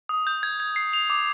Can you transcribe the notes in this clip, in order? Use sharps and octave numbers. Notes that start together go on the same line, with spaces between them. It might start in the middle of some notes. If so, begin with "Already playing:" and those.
D#6
G6
G#6
G#6
C7
F7
D6